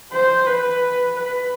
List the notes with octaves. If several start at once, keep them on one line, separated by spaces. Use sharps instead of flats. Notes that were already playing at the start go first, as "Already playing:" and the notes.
C5
B4
B4